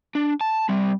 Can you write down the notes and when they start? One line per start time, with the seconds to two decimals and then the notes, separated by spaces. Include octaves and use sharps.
0.15 D4
0.41 A5
0.69 G3 C4